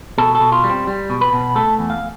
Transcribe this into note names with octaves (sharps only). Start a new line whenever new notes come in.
B2 A4
A4
B2
F4
G3
C4
G3
B2
B4
B2
A3 A4
E2
F5